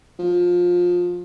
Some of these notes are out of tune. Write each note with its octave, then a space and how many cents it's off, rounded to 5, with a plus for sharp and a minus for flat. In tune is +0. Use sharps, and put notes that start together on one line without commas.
F3 +20